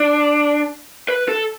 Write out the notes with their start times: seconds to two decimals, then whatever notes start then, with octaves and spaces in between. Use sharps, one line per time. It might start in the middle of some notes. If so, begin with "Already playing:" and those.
Already playing: D4
1.08 B4
1.28 A4